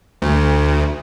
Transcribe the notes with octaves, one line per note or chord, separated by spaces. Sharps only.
D2